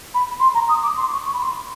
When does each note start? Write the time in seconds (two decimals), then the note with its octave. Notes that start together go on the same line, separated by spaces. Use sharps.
0.14 B5
0.40 C6
0.54 A#5
0.69 D#6
0.83 D6
0.97 C6
1.12 C#6
1.26 C#6
1.33 B5
1.40 C6